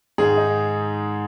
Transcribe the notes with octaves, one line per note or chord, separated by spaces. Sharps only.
G#2 D#3 G#3 G#4
D#4